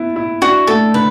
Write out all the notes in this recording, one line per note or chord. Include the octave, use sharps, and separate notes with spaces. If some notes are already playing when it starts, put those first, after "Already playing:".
Already playing: B3 E4
E4
D4 F#4
A3 A4
D3 B4